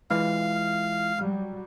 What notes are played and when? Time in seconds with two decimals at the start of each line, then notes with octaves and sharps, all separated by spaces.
0.11 E3 G#3 E4 F4 F5
1.18 F#3 G3